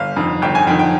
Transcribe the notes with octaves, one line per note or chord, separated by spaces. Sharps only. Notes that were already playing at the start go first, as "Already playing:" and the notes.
Already playing: G1 F5
F2 D#3
G1 G5
G#5
F2 D#3 G5
G5